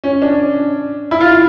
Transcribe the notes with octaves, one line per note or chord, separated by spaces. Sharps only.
C#4
D4
E4
F4